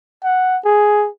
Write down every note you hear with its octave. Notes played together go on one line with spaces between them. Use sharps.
F#5
G#4